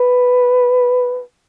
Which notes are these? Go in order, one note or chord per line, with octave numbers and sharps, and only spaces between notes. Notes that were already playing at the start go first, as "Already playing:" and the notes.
Already playing: B4